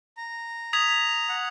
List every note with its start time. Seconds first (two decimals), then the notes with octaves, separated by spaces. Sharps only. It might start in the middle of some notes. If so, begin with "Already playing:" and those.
0.17 A#5
0.73 D#6 G#6 B6 F7
1.29 F#5